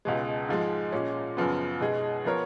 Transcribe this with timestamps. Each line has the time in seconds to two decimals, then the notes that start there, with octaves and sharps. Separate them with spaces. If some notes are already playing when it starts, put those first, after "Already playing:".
0.05 C#2 B2 G#3
0.49 G#2 F3 G#3
0.92 A#2 G#3 C#4
1.37 F#2 C#3 F3 B3
1.80 B2 G#3 D#4 G#4
2.25 F3 B3 F4 A#4 C#5